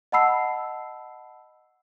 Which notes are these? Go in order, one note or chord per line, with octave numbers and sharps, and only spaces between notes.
D#5 F#5 A5 B5 E6 C7